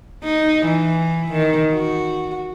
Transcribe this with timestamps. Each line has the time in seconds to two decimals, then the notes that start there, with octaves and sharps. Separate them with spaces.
0.24 D#4
0.66 E3
1.31 D#3
1.72 F#4